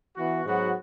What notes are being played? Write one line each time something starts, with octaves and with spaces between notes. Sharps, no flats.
E3 B3 F#4
G#2 F#3 B3 F#4